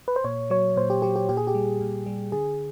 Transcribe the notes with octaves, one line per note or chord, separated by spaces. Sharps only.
B4
C5
A#2 C#5
F#3 C#5
A#2 C5
G4
F#3 G4
G4
A#2 G4
G#4
G4
G3
A#2
G3
D3 G#4